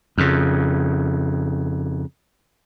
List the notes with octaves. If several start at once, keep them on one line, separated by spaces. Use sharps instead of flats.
F2 C#3